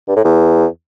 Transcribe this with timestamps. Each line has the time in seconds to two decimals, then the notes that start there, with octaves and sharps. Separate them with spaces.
0.08 G2
0.16 A2
0.24 E2